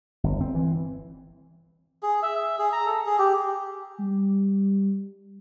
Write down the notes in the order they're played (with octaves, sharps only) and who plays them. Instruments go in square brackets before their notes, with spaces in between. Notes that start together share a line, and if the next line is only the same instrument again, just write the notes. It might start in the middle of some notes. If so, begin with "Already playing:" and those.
[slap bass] G1
C4
E3
[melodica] G#4
E5
E5
G#4
A#5
A4
G#4
G4
[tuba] G3